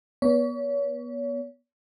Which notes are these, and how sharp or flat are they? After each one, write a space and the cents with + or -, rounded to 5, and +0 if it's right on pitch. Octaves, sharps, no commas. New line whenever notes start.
B3 -25 C#5 +35